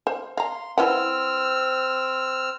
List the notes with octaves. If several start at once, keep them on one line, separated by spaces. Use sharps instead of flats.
C5
F5 A#5 C6
C4 E4 B4 F#5 E6 F6